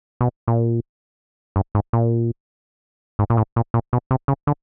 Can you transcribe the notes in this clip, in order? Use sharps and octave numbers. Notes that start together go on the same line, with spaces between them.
B2
A#2
G2
G#2
A#2
G#2
A#2
A2
A#2
A#2
B2
C3
C#3
D3